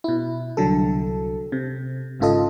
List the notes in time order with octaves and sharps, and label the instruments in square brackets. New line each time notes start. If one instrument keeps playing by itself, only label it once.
[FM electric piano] B2 E4
C2 D3 F#3 A4
C3
G#1 G#2 C#3 F4 A4 D#5